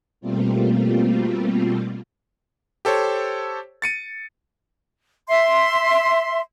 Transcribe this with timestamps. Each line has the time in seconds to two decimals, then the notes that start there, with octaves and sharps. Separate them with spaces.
0.21 B2 G3 A3 A#3 C4 F4
2.85 G4 A4 C5 C#5
3.82 A6 C#7 D#7
5.28 E5 C6